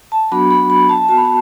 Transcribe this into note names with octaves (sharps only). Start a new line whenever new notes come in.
A5
F#3 B3 D4 F#4 B5
B5
B5
A5
B3 F#4 A5
B5
A5